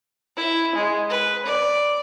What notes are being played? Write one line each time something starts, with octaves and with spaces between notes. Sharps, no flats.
E4
G#3
B4
D5